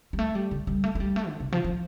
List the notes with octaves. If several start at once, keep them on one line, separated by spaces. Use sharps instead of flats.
G3
A3
G3
D3
G3
A3
A3
G3
A3
D3
C3
F3
F3